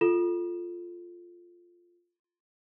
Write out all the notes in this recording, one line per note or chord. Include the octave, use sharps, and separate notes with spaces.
F4 A4 E7